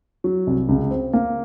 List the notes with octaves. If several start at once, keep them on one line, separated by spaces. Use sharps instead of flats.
F#3
C2
C#2
C4
A#3